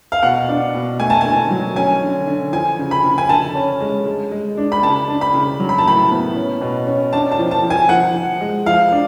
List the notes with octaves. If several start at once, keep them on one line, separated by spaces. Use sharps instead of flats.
F5
B2 F#5
D4
B2
A3 G#5
A5
D3 G#5
F#3
C#4 G#5
D3
D3
F3 G#5
C#3
B5
C#3
G#5
D3 A5
C#4
G#3
G#3
G#3
D4
B5
C#3 A5
D4
B5
C#3
F#3
B5
A5
A2 B5
B3
C#4
B2
C#4
D4 A5
A5
F3
A5
F3
G#5
F3 F#5
F3
G#3
F3 F5
D4